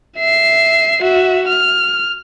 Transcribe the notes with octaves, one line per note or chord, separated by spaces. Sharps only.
E5 C7
F#4 E5
F6